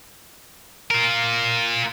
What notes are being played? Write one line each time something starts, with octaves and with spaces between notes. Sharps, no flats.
F4 A#4